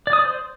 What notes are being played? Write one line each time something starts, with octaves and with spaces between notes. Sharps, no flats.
D5
D#6
D5
C5